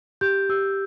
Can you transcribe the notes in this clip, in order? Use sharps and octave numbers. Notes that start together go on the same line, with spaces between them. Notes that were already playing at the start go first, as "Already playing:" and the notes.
G4 G6
G4 E6